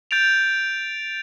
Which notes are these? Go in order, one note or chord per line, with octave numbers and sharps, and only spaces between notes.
G6 A6 D7 F7